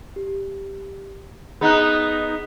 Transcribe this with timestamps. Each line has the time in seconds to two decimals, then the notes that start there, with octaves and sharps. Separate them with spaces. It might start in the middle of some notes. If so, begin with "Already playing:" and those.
0.16 G4
1.61 B3 D#4 G#4 F#5 F#6